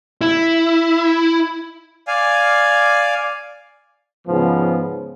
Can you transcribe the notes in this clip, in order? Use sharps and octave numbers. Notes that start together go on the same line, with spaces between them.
E4
D5 F5 G#5
G#2 C#3 F3 B3